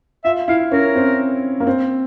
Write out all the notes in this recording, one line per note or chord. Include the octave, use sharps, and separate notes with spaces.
F4 E5
E4 F5
C#4 A#4
C4
A#3
C4